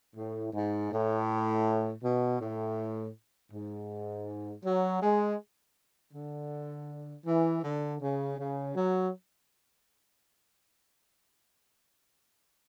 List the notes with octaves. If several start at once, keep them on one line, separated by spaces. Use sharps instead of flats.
A2
G#2
A2
B2
A2
G#2
F#3
G#3
D3
E3
D3
C#3
C#3
F#3